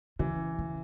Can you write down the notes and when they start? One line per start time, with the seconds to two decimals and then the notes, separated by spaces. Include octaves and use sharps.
0.19 C#3 E3
0.59 C#3